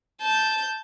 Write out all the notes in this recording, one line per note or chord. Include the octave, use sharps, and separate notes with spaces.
A5 G6